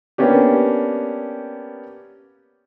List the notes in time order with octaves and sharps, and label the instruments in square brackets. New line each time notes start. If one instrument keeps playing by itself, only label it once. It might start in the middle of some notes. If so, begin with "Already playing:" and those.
[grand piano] A#3 B3 C#4 D4 G4